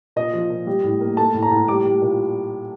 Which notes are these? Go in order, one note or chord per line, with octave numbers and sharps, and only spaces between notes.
A#2 D#5
F3
A#2
G3
A2
A#3
A3 A5
A2
A#5
A2
G3 D6
G3
A#2